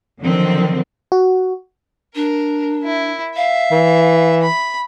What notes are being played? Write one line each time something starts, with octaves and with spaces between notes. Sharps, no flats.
D3 D#3 F3 F#3 C4
F#4
D4 A#4
E4
E5 F5
E3
B5